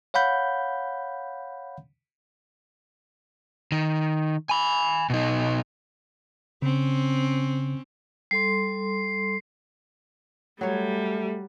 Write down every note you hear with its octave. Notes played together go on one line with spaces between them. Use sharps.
C#5 F5 F#5 B5 G6
D#3
G#5 B5
B2 D#4
C#3 C4 C#4
G3 A4 C6 C7
F#3 G3 A3 C#5